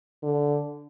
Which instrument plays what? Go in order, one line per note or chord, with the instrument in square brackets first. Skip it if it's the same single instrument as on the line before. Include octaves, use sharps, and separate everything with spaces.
[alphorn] D3